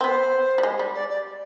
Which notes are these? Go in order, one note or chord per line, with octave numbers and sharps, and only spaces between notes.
C4
B3 C5
G3
G#3
G3
D5
D5